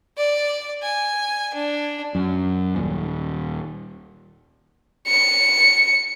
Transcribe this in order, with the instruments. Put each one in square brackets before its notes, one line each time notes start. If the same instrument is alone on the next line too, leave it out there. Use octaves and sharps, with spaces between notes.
[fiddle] D5
G#5
D4
[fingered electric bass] F#2
D#1
[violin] C#7